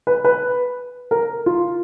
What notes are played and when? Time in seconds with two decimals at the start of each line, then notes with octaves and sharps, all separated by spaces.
0.07 B4
0.24 B4
1.11 A#4
1.46 F4